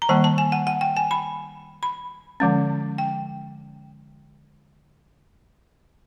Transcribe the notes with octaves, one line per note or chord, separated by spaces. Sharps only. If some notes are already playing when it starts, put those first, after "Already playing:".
A#5
D#3 G3 A#3 A5
A5
G#5
F#5
F#5
G5
G#5
B5
B5
D3 F3 G#3 C#4
G5